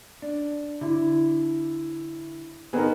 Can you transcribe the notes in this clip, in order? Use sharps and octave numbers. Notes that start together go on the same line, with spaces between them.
D4
D3 E4
D#3 B3 C4 D#4 G#4 A#4